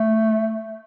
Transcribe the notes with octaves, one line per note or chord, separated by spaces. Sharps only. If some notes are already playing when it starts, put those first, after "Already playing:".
Already playing: A3